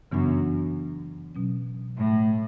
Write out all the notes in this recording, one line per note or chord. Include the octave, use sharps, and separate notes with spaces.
F#2 C#3 E3 B3 D4 F#4
B2 F#3 C#4
A2